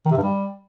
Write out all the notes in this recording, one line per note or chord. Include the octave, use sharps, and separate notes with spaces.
D#3
C3
G2
G3